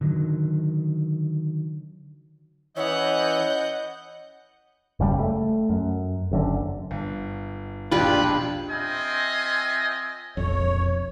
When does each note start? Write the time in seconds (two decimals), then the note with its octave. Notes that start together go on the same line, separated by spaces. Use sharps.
0.01 D3 D#3 F#3
2.76 E3 C#4 B4 C#5 D#5 E5 F#5 G6
5.00 F#1 C#3 G3
5.20 A3
5.70 F#2
6.31 F#1 F#2 D3
6.91 G1
7.92 E1 A#1 D4 F4 G4 B4
8.70 C4 F4 D#5 E5 G5 G#5
10.37 E1 A#1 F2 C#5